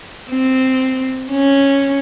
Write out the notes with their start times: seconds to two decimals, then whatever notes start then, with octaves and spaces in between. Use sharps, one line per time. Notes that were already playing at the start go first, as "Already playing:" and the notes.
0.30 C4
1.31 C#4